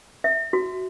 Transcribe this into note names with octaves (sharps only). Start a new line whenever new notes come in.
E5
F#4